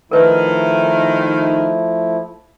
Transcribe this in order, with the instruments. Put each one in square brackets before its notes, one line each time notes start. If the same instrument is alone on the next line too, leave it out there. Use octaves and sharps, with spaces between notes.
[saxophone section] D#3 [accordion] F3 A3 E4 [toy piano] A#4 B4